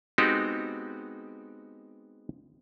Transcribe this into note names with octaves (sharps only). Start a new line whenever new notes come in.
G#3 B3 C4 D#4 F#4 G4